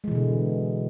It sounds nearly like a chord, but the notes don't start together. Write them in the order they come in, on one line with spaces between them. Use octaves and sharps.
G#3 E3 B2 D3